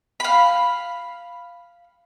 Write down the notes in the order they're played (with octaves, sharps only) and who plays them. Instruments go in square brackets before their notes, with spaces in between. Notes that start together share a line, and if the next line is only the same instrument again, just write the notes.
[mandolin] F5 B5